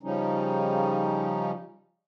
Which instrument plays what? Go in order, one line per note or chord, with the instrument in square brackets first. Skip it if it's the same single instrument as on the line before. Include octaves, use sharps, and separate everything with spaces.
[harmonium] C#3 F3 G3 C#4 D#4